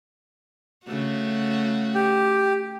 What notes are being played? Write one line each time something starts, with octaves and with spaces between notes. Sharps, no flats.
C#3 A3 F#4
G4